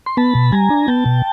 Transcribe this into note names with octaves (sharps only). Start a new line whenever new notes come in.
C6
B3 A5 B5
B2
G3 G#5 A#5
D4
B3 G5 A5
B2